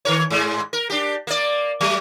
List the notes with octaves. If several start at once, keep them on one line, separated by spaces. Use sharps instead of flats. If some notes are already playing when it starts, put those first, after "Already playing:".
D#3 A#4 C#5
G#2 G#3
A#4
D4 G4
A#3 D5
F#3 A3